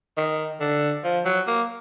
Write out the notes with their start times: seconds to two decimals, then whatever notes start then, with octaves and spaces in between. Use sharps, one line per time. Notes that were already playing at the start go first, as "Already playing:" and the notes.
0.17 D#3
0.60 D3
1.04 F3
1.25 F#3
1.47 A#3